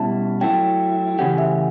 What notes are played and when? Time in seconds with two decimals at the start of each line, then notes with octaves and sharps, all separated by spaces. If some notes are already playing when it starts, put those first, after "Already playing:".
Already playing: B2 G3 C#4 E4 A5
0.41 F#3 A3 E4 G5
1.19 C#3 E3 A3 C#4 G4 F#5
1.38 E5